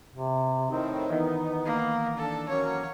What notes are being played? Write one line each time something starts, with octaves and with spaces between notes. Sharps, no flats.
C3
A2 D#3 C4 D#4
D#3 E3 B3
A#3
D4 A4
F#3 A#3 C#4 C#5